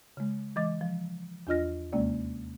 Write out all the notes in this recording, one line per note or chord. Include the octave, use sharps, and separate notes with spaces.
C#3 G#3
E3 G#3 D#5 D6 A6
F3
E2 D4 F4 D#5 F6 A#6
D#2 C3 G#3 A#3 C#4 D5